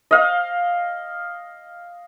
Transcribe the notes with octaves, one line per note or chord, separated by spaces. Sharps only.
D#5 F5